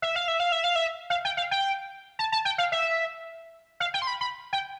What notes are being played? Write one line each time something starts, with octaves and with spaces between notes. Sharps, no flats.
E5
F5
E5
F5
E5
F5
E5
F5
G5
F5
G5
A5
A5
G5
F5
E5
F5
G5
C6
B5
B5
G5